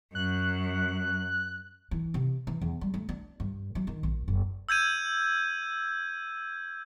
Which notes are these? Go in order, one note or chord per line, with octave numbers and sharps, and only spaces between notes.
F#2 F#6
E3
C3
E3
E2
G3
A3
D4
G2
F#3
D#3
A#1
F#1
E6 G6 G#6 D#7